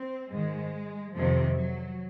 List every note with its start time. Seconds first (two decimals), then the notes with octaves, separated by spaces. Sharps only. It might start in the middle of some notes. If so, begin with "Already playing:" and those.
Already playing: C4
0.31 G#2 D#3 G#3
1.13 F2 C3 D#3 F3
1.56 F#3